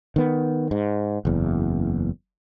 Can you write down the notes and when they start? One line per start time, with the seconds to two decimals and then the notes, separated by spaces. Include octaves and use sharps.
0.16 D#3 B3
0.71 G#2
1.25 F#1 E2